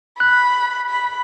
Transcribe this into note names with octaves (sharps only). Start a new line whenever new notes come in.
B5 F#6
B5